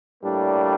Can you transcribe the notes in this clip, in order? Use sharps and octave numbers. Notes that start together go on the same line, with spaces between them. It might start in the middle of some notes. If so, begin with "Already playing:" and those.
A2 G3 A#3 D4